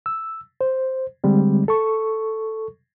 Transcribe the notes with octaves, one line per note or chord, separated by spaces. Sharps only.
E6
C5
D3 G3 G#3 C4
A4 C#6